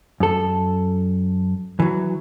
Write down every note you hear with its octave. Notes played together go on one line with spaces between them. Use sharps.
F#2 A4
E3 F#3